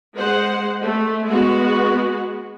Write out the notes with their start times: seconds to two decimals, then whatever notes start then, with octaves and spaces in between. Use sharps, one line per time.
0.17 G#3 C5 F#5
0.84 A3
1.28 G#3 B3 F#4